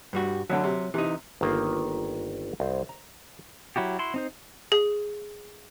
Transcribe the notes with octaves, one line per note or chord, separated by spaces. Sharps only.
G2 G3 F#4
D2 D3 F#3
C3
C3 E3 D#4
G1 D#3 A#3 F4
C2 C5
A#5
F#3 E4 F#4 G4
E4 F#4 C6
C4 D#4 C5
G#4